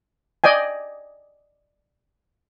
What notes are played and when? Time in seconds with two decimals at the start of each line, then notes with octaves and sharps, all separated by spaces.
0.44 D5 D#5 G5 G#5